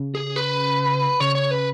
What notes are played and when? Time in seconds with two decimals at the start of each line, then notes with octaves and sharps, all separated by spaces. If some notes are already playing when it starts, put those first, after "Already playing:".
Already playing: C#3
0.15 G#4
0.36 B4
1.20 C#3 C#5
1.35 C#5
1.51 B4